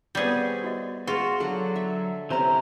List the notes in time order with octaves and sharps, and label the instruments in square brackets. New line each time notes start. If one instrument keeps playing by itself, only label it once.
[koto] G3 G#4 [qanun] B3 C4 C#5
[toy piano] F#4 D#5
[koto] F4 [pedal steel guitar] F#4 [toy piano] G#4 B4
[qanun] D3 D5 F#5 [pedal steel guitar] F#3
[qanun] E5
[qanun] C3 C#4 [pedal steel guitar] E3 C5 A#5